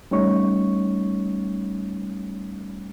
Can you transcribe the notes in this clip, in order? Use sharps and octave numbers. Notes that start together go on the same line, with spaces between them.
G3 A3 C#4 D#4 C#5 C#6